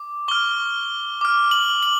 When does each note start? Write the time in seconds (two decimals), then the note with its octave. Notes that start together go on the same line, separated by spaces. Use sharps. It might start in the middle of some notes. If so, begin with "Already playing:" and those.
Already playing: D6
0.28 C#6 F6 G7
1.21 D6 F6
1.51 F#7
1.83 F#7